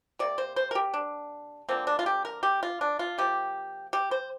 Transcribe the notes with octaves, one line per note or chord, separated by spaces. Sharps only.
C3 A#3 D5
C5
C5
A#4
G4
D4
D3 F3 A#3 C4
D4
F4
G4
A#4
G4
F4
D4
F4
C3 F3 A#3 G4
G4
C5